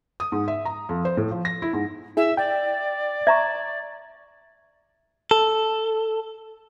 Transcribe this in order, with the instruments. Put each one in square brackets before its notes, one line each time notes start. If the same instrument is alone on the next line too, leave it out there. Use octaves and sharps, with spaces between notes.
[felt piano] D#6
G#2
E5
A#5
F2
C5
A2
F3
A#6
E4
G#2
[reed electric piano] E4 G#4 [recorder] E5
[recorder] D5 [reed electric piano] G5
[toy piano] E5 A#5 C#6 [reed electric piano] G#6
[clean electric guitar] A4